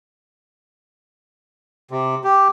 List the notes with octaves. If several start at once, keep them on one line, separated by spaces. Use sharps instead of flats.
C3
G4